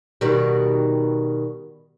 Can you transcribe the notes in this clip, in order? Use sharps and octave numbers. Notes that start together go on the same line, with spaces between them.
B2 D#3 G3